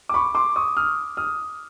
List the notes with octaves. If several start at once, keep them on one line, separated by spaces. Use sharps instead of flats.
D6
B5 C#6
C6 D6
C#6 D#6
D#6 F6
D#6 F6